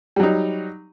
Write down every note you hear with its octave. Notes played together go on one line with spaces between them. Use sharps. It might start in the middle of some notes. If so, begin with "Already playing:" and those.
F#3 G3 D#4